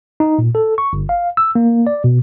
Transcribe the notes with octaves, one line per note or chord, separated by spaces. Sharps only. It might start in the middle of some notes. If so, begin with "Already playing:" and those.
D#4
A#2
A4
C#6
G1
F5
E6
A#3
D5
B2